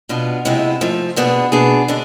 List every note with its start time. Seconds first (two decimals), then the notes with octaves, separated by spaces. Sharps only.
0.09 B2 B3 D4 F4
0.45 F2 C3 G#3 B3 E4
0.81 G#2 F3 A3
1.16 B2 B3 D4 G#4
1.52 B2 B3 D4 G#4
1.88 D3 G#3 D4